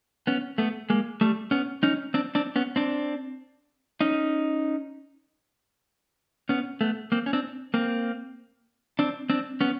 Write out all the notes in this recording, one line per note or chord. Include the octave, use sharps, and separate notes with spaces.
B3 C#4
A3 B3
G#3 A#3
G3 A3
B3 C#4
C#4 D#4
C4 D4
C4 D4
B3 C#4
C4 D4
C#4 D#4
B3 C#4
A3 B3
A#3 C4
C#4
C4 D4
A#3 C4
C4 D4
C4 D4
B3 C#4